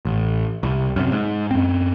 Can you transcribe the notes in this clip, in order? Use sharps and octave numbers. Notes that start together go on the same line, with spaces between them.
A1
C2
F#2 C3
G#2
F#2 C4